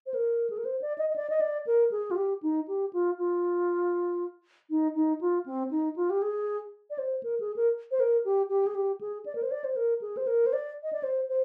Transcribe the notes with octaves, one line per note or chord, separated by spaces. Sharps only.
C5
A#4
G#4
A#4
C5
D5
D#5
D#5
D5
D#5
D5
A#4
G#4
F4
G4
D#4
G4
F4
F4
D#4
D#4
F4
C4
D#4
F4
G4
G#4
D5
C5
A#4
G#4
A#4
C5
A#4
G4
G4
G#4
G4
G#4
D5
A#4
C5
D5
C5
A#4
G#4
C5
A#4
C5
D5
D#5
D5
C5
C5